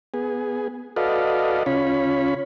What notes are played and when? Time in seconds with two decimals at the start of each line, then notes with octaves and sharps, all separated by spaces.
0.14 B3 G#4
0.96 F#4 A4 B4 D5 D#5 F5
1.66 C#3 C#4 F4 C#5 B5